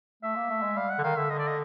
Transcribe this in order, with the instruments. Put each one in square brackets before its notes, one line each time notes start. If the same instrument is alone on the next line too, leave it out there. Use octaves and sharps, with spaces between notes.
[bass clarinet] A3 [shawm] E5
[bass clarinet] A#3
A3
G#3
[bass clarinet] G3 [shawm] F5
[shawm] F#5
[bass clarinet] D3
[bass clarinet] D#3 [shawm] F5
[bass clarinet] D3 [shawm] E5
[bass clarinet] D3 [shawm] D#5
[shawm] D5
D#5